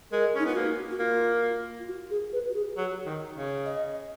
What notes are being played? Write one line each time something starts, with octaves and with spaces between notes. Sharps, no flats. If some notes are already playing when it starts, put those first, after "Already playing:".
G#3 A#4
C#4 D#4
B3 F4
A#3 F#4
F#4
A#3 F4
F4
F#4
G#4
B4
F#4
G#4
F#3 F#4
D#3
C#3
D#5